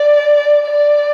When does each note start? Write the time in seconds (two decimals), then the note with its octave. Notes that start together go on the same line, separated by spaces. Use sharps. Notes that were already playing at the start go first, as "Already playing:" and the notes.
Already playing: D5
0.66 D5